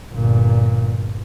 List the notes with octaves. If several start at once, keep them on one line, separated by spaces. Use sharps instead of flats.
G1 A#2